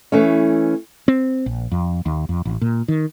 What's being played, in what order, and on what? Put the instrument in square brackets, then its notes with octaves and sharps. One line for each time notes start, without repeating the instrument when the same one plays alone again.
[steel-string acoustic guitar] E3 A3 C#4
[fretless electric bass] C4
A#1
F2
D#2
F2
A1
A#2
D#3